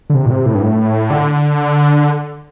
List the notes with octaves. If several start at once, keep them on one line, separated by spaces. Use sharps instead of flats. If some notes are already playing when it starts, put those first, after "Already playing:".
D3
C3
A2
C3
A2
G2
A2
D3